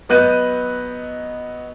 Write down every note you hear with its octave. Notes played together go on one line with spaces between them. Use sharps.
F#3 B3 D#5 F#6 G6 D#7